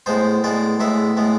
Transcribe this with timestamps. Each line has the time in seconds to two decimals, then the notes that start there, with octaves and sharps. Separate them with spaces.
0.06 A2 G#3 B3 C5
0.44 A2 G#3 B3 D5
0.80 A2 G#3 B3 E5
1.17 A2 G#3 B3